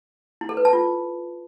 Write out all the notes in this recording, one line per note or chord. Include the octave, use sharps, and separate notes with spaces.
E4
A4
B4
A5
F4